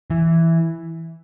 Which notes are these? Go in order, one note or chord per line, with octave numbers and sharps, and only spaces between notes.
E3